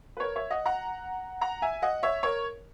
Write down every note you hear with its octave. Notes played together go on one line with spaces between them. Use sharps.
B4
A#4 C#5
C#5 E5
D#5 F#5
F#5 A#5
F#5 A#5
E5 G#5
D#5 F#5
C#5 E5
A#4 C#5